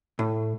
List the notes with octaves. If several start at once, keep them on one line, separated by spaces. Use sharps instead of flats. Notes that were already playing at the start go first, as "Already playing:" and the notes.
A2